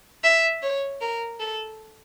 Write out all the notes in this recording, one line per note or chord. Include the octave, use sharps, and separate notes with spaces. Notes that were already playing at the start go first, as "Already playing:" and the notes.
E5
C#5
A#4
A4